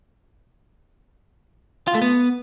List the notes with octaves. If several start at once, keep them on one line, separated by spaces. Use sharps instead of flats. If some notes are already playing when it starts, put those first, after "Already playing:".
F4
A3
B3